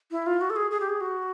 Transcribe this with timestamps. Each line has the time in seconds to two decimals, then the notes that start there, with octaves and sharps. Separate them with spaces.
0.11 E4
0.26 F4
0.41 F#4
0.50 A4
0.56 G#4
0.71 G#4
0.80 G4
0.89 G#4
1.01 F#4